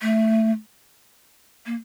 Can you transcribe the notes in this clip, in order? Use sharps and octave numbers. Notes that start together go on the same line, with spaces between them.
A3
A#3